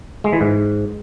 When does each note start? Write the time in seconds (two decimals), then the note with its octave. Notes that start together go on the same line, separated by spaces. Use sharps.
0.24 G#3
0.33 E3
0.41 G#2